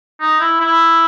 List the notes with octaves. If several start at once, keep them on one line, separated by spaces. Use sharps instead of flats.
D#4
E4
E4